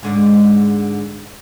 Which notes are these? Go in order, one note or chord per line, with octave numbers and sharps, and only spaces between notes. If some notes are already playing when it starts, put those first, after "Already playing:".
G#2 D3 G#3